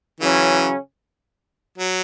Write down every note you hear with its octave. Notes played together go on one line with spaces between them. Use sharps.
C#3 E3 F#3 C#4
F#3